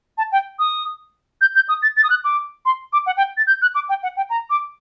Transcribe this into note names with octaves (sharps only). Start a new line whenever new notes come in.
A5
G5
D#6
G6
G6
D#6
A6
A6
D#6
F#6
D6
C6
D6
F#5
G5
A6
G6
F#6
D6
G5
F#5
G5
A#5
D6